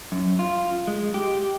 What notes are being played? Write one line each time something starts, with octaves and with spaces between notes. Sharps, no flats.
F#2
F4
G#3
G4